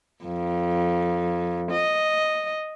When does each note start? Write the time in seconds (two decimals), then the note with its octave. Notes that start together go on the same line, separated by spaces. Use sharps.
0.23 F2
1.71 D#5